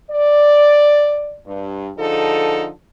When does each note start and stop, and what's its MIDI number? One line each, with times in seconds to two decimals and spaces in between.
0.11 1.37 74
1.46 1.90 43
1.97 2.68 50
1.97 2.68 53
1.97 2.68 63
1.97 2.68 68
1.97 2.68 69